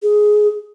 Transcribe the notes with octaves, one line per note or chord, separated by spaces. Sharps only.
G#4